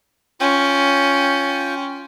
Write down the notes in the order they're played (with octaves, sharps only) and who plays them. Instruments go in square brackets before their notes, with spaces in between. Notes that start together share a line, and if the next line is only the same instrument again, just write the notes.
[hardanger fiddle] C#4 [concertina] F4 G5